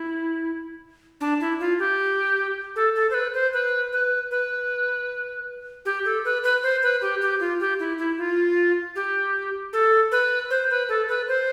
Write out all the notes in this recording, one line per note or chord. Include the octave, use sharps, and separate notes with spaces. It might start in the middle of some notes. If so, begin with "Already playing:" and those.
Already playing: E4
D4
E4
F4
G4
A4
A4
C5
B4
C5
B4
B4
B4
G4
A4
B4
B4
C5
B4
G4
G4
F4
G4
E4
E4
F4
G4
A4
B4
C5
B4
A4
B4
C5